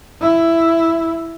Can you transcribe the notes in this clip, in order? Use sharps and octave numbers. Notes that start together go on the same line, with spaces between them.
E4